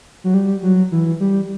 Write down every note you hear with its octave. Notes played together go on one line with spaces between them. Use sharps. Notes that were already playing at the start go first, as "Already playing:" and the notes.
F#3
G3
F#3
E3
G3